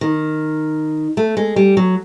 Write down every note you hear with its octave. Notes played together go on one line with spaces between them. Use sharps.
D#3
A3
G#3
G3
F#3